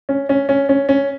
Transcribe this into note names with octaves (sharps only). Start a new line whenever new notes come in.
C#4
C#4
C#4
C#4
C#4